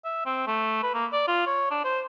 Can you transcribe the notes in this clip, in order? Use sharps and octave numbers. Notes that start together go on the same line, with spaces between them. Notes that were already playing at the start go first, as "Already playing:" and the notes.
E5
C4
A3
B4
A#3
D5
F4
C#5
D4
C5